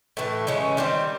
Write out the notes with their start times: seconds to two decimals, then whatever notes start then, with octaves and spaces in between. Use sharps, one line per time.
0.17 A2 E3 A3
0.47 C#3 E3 G#3 C#4
0.77 D#3 G3 C4